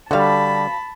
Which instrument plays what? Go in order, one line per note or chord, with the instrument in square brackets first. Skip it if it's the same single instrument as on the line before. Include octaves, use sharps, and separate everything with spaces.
[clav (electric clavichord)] D3 G3 [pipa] F#4 F5 [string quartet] A5 B5